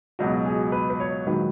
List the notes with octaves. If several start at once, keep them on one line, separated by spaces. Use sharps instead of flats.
C#2 B2 F#3 F#4
G#4
B4
B4
C#5
A#1 G#2 D#3 F#3 B4